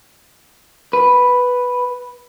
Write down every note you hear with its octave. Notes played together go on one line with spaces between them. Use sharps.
B4